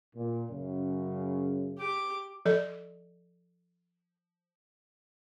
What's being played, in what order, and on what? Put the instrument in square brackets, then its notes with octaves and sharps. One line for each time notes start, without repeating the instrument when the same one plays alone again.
[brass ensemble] A#2
F#2 C#3
[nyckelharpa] G4 D6
[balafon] F3 A4 D5